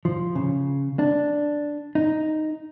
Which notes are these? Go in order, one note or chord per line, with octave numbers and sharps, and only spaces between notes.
F3
C#3
D4
D#4